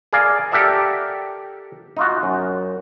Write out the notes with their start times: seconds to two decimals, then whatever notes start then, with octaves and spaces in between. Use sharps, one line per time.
0.13 G#4 A#4 D5 F5 G#5
0.52 G4 A4 A#4 D5 E5 F#5
1.97 D#4 F4 F#4
2.23 F#2